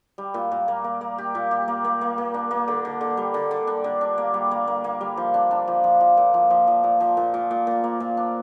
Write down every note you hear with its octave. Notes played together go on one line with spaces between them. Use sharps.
G3
A#2
A#2
A#3
A#3
A#3
G4
A#2
G4
A#3
A#3
A#3
A#3
D4
A#3
D3
D3
D3
G3
D3
D3
D4
D3
D4
A#3
G3
A#3
A#3
A#3
G3
F3
D4
D4
F3
F3
F3
A#2
F3
F3
F3
A#2
F3
A#2
A#2
A#2
A#2
A#3
A#2
D4